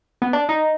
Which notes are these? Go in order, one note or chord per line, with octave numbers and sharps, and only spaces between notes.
B3
D4
D#4